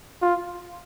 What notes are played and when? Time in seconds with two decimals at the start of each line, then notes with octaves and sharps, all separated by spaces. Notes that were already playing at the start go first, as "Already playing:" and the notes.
0.22 F4